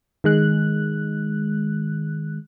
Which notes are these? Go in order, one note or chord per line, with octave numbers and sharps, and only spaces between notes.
D#3 G#3 F#6